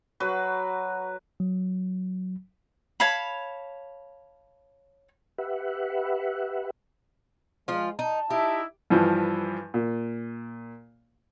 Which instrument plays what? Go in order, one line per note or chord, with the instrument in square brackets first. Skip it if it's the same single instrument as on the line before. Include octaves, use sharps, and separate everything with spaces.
[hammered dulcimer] F#3 F#4 B4
[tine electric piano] F#3
[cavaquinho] C#5 F5 A5 B5
[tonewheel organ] G4 B4 E5 F#5
[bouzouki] F3 F4 [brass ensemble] G#3
[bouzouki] D#4 [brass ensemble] A5
[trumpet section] D#4 E4 E5 [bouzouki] G4
[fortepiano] G2 E3 F3
A#2